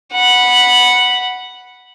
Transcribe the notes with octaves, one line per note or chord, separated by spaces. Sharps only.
F#5 B5